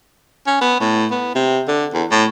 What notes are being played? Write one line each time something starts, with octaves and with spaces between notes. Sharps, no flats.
C#4
B3
A2
B3
C3
D3
E2
A2